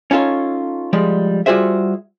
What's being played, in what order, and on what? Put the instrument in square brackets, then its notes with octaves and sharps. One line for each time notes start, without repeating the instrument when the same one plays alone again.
[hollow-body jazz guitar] C#4 D#4 F4 A4 C#5
F3 G3 G#3
G3 F4 F#4 G#4 C5 E5